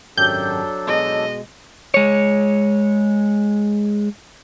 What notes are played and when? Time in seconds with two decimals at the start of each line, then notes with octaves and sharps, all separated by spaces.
0.18 G#1 F#2 F#3 D4 G4 A4 G6
0.87 B2 G#3 D#5
1.94 G#3 C#5